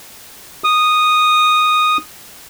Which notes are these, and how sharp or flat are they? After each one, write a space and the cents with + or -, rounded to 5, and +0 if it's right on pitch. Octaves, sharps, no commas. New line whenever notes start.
D#6 -10